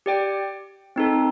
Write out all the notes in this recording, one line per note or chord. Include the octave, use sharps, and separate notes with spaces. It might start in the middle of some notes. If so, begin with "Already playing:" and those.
G4 D5 G5
C4 D#4 A4